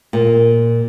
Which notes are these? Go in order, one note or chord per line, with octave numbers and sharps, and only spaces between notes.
A#2